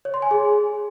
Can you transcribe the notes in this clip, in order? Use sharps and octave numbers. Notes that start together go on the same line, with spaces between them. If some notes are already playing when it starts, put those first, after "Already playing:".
C#5
C6
G#5
G#4